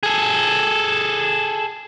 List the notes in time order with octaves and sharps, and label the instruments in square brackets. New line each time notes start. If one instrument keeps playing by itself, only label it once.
[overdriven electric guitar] G#4 A4